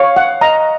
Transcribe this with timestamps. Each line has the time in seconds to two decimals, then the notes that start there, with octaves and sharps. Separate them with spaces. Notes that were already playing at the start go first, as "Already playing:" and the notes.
Already playing: C#5 F5
0.16 F#5
0.41 D#5 A#5